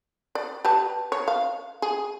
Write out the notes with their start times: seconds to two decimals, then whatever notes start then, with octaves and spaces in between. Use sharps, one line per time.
0.35 D5
0.65 G4 B4 A5
1.12 C#5
1.28 F5
1.82 G#4